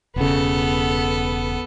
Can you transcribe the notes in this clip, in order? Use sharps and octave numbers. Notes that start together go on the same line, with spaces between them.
E1 C#3 B3 A4